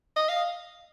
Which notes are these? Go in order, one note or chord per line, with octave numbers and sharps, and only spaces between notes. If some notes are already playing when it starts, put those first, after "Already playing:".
D#5
F5